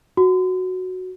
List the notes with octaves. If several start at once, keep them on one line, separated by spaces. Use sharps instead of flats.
F#4